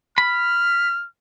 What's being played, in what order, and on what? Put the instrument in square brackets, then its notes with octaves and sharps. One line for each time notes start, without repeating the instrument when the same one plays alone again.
[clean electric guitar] B5 [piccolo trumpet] F6